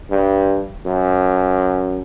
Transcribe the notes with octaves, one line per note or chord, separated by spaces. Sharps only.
G2
F#2